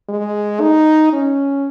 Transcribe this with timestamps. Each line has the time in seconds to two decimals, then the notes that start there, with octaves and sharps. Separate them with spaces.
0.09 G#3
0.60 D#4
1.13 C#4